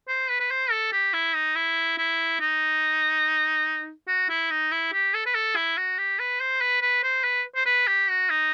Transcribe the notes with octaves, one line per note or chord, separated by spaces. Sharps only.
C5
B4
B4
C5
A4
G4
E4
D#4
E4
E4
D#4
F#4
E4
D#4
E4
G4
A4
B4
A4
E4
F#4
G4
B4
C5
B4
B4
C5
B4
C5
B4
G4
F#4
D#4